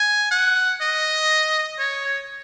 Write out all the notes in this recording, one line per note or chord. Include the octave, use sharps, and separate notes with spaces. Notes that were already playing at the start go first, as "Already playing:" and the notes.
Already playing: G#5
F#5
D#5
C#5